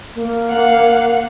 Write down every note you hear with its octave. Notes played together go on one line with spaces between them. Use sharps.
A#3
F5 F#5